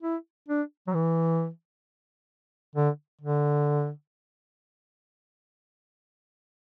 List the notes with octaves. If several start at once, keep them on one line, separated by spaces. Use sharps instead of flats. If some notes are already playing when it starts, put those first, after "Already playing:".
E4
D4
F#3
E3
D3
D3